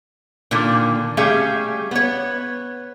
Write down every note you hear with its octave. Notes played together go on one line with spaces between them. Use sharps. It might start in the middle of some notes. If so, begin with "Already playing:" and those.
A#2 D3 D#3 A#3
G3 A3 C#4 G#4 E5 F5
B3 C#5